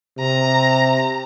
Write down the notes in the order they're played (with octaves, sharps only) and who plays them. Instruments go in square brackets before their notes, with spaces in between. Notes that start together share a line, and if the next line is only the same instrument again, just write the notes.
[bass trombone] C3 [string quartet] A#5